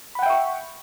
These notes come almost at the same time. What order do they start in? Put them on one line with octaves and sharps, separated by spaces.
B5 F#5 G5 E5 C#6